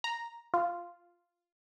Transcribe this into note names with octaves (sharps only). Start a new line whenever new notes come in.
A#5
F4